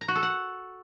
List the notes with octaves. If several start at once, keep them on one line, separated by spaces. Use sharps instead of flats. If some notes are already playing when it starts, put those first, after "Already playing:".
A#5
F#4
A4
F#5